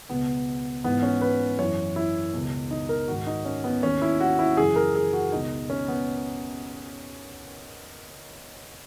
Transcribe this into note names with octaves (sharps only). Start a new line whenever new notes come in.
C#2 B2 B3
G#2 E3 B3
C#4
B4
F#2 E3 C#5
E4
C#2 B2
D#4
A#4
G#2 D#3 F#4
D#4
C#4
B3
D#2 D#3 C#4
E4
F#4
E4
F#2 C#3 E3 G#4
A#4
G#4
F#4
C#2 B2 D#4
C#4
B3